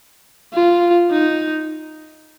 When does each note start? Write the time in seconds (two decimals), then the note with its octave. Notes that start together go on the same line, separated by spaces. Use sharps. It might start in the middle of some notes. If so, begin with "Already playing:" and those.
0.53 F4
1.10 D#4